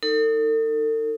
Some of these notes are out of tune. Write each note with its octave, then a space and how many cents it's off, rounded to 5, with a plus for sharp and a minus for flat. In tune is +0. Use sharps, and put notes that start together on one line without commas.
D#4 +0 A4 +40